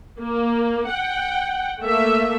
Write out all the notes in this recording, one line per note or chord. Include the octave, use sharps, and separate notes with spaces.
A#3
F#5 G5
A3 A#3 E5